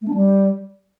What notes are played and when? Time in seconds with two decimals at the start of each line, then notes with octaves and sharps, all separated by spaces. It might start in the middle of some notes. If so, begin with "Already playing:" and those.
0.02 A3
0.08 D4
0.14 G3